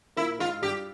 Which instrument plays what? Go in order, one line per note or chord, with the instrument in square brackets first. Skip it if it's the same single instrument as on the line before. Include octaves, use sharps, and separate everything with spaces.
[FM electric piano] A#2 A#3 [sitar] E4
[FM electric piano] G#2 G#3 [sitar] F4
[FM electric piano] G2 G3 [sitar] G4